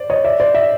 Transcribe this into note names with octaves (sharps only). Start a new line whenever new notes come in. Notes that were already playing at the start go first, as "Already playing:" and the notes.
Already playing: C5 D5
C#5 D#5
D5 E5
C5 D5
D5 E5